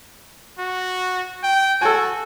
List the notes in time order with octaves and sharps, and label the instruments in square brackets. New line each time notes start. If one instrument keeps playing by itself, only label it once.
[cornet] F#4
G5
[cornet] F#4 [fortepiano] A4 G#5